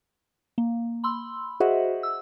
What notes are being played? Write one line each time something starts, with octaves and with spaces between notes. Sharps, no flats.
A#3
B5 C6 E6
F#4 G#4 C5 D#5 E5 F#5
E6